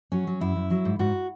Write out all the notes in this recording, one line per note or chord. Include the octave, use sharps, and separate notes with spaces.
F#3 C#4
F#3
F#2 E4
F#2
F#3
G#2
G#2 F#4